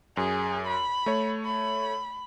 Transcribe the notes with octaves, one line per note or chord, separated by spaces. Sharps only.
F#2 G#4
B5
A3 C#5
B5